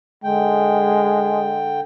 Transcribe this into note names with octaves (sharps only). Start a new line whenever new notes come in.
D3 G#3 G5